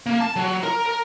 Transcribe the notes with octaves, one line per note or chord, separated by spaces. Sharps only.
A#3
A5
F#3
A#4
A#4